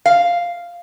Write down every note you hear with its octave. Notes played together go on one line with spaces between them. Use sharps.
F5